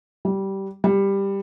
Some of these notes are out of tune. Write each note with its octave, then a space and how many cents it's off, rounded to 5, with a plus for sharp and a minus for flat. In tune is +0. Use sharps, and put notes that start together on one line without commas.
G3 -15
G3 +10